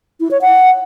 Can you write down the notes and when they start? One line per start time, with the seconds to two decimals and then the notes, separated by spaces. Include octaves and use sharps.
0.20 E4
0.31 C#5
0.42 F#5